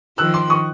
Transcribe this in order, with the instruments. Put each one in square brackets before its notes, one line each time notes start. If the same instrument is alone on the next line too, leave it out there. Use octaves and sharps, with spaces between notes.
[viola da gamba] D#3 F3 [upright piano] E6 F#6
[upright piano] C6 D6
C#6 D#6